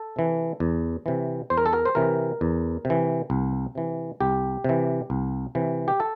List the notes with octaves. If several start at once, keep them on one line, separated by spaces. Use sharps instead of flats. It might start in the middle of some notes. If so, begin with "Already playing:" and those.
Already playing: A4
C3 E3
E2
C3 E3
E2 C5
A#4
A4
A#4
C5
C3 E3 A#4
E2
C3
E3
C2
C3 E3
C2 G4
C3 E3
C2
C3 E3
G4
A4